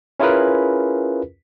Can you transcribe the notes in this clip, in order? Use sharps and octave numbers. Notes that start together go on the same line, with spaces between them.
C#4 E4 F4 G#4 A#4 B4